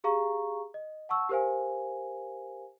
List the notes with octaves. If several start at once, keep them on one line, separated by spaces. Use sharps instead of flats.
G4 G#4 F5 A#5 C#6
D#5
F#5 A5 C#6 E6
G4 A#4 C5 F5 G#5